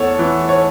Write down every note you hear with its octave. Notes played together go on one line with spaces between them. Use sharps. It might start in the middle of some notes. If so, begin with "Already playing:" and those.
Already playing: E2 A4 C#5
E3
C#5